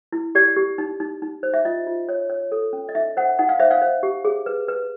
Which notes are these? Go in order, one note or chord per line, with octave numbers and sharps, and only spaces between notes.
E4
G4 D5
G4
D#4
D#4
D#4
C5
E5
F4 D#5
F4
C#5
C#5
A4
C#4
D#5
D#4 E5
C5 F#5
D#4 F#5
F5
C5 E5
F5
C5
G4
G#4
B4
B4